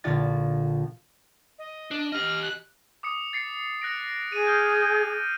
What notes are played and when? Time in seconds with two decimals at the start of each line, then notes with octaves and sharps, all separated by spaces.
0.04 A#1 D3 F4 E5 A6
1.59 D#5
1.91 D4
2.12 G4 D#5 F6
2.42 F#6
3.03 D6 D#6 C#7
3.33 A6 C7 C#7
3.81 F#6 A#6 D7
4.32 G#4 D#7
4.47 F6 G6